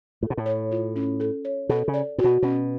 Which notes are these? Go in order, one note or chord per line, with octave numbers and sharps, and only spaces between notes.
A2 A4
B2
A2
C#5
F4
C#4
A4
C#5
B2 A4
C#3
D5
A2 F#4
B2
B2 C#4